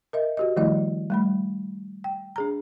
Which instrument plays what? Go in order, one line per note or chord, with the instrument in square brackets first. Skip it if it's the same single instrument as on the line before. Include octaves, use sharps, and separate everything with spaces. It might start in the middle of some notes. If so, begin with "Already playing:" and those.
[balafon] A#4 D#5 E5
F#4 G4 D#5
D#3 F3 G3 A3 E4 D#5
G3 A3 B5
G5
D4 G#4 A#5